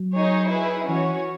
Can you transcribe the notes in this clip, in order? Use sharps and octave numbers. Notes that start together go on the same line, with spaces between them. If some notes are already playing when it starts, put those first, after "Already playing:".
Already playing: F#3
D#4 G#4 C#5
E4 G#4 B4
E3 C#4 F#4 C#5